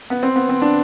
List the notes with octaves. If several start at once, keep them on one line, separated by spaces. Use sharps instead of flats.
B3
C4
B3
C4
D4